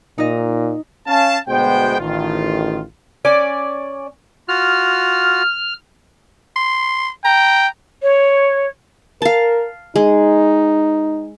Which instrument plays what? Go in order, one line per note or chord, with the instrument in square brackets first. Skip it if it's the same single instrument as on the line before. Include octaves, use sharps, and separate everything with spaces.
[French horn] A#2 [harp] D#4 D#5
[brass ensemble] C#4 F5 A5
D2 B2 G#3 B3 C5 G5
A1 D#3 F4
[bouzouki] C#4 D5 G#5
[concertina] F4 F#4 [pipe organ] F6
[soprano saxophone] C6
[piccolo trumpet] G5 [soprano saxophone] A#5
[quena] C#5
[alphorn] A#4 [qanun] F5 A5
[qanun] G#3 [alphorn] D#4